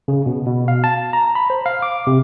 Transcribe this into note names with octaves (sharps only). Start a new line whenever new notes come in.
C#3
B2
B2
F5
A5
A#5
B5
C5
F5
D6
C3